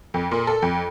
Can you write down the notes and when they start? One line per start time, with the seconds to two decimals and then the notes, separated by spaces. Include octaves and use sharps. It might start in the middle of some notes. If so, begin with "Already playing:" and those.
0.14 F2
0.31 A#2
0.47 A4
0.62 F2